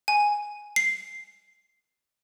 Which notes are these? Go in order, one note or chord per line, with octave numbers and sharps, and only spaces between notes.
G#5
C7